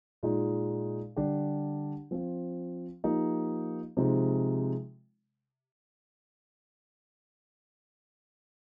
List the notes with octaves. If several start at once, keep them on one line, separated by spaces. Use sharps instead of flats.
A#2 G#3 D#4
D3 G3 D4 G4
F3 C4 F4
F3 A#3 D#4 G4
C3 F3 G#3 D#4